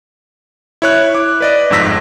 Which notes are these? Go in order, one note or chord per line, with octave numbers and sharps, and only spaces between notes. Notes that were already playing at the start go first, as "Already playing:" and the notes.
E4 C#5 F#6
D6
B4 D5 D#5
G1 F2 G#2 E6 A#6 B6